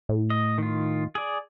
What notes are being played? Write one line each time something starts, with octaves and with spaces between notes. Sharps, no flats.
A2
D#5
D#3 F4
G#4 D5